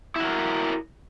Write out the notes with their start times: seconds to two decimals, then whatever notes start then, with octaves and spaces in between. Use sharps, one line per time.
0.16 E4
0.20 F#4
0.25 A#4